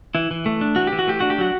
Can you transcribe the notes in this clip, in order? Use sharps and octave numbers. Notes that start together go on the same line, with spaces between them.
E3 E4
E3
A3
D4
E3 F#4
G4
E3
F#4
A3 G4
D4 F#4
G4
F#3 F#4